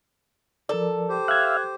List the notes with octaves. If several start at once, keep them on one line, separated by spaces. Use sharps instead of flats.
F3 A4 A#4 D5
G4 C5
E5 F5 F#6 G#6